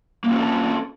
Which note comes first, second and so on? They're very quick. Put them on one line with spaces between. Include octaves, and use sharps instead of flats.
A#3 C#4 F4 C4 A4